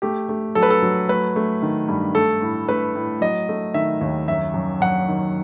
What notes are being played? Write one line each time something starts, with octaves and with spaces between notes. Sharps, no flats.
A3 G4
A3
F#3 A4
B4
A4
F#3
A3 B4
A3
D#3
G2
A3 A4
A2
A3 B4
A2
F#3 D#5
A3
D#3 E5
D#2
F#2 E5
F#2
F#2 F#5
D#3